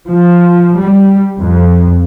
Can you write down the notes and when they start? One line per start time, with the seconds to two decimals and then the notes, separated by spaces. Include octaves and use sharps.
0.11 F3
0.80 G3
1.40 F2